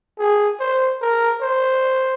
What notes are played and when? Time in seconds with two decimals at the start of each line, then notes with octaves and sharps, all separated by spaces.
0.19 G#4
0.60 C5
1.02 A#4
1.42 C5